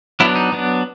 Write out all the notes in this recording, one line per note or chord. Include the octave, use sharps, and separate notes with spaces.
F#3 B3 D4 E4
D#4
F#3 B3 D4